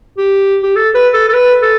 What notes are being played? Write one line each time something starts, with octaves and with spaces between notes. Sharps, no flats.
G4
G4
A4
B4
A4
A4
B4
A4